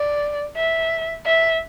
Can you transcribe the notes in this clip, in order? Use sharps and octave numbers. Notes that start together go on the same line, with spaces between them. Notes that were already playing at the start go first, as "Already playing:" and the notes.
Already playing: D5
E5
E5